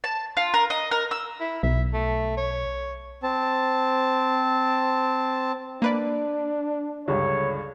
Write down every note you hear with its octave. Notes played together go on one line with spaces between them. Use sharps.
A5
F4
A#4
D#5
A#4
E6
E4
B1 E5
A3
C#5
C4 A5
A#3 D4 B4 D5
C#2 G2 D3 C#5